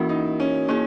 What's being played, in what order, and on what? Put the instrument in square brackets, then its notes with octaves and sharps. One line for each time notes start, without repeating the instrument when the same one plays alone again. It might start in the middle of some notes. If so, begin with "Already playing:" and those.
Already playing: [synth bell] E3 A#3 C#4 F#4 A#4 [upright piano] E4
[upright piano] D#4
C#4
[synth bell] A#3 E4 G#4 [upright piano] C#4